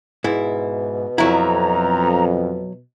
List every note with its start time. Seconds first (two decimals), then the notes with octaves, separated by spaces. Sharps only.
0.24 G#2 B2 E4
1.18 F2 F#3 E4 A#5